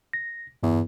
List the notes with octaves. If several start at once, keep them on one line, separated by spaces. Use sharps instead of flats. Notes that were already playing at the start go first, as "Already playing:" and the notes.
A#6
E2 G2